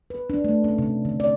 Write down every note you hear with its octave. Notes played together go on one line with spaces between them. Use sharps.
B4
D4
A3
C#4
C3
D3
D5